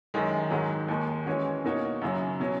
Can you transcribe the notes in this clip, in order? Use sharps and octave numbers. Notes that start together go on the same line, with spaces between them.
F#2 D#3 G#3
G#2 D#3 F#3
D#2 D#3 G#3
E3 G#3 C#4 F#4 C#5
B2 A#3 D#4 F#4 C#5
F#2 C#3 F#3
B2 F#3 C#4